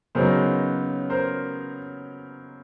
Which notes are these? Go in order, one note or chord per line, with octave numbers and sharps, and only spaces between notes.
C#3 F#3 B3 D#4 A#4 C5
A#4 C5